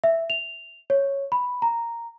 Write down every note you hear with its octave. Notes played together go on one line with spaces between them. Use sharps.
E5
F7
C#5
B5
A#5